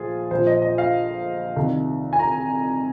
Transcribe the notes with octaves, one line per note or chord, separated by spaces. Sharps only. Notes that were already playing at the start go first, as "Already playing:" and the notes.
Already playing: A#1 A#2 F3 F4 G#4
A#1 A#2 F3 C5
D#5
D#5
F5
C2 C3 D#3
G#5
A#5